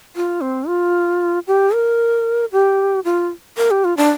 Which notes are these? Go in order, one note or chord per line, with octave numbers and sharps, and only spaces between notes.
F4
C4
F4
G4
A#4
G4
F4
A#4
G4
F4
D4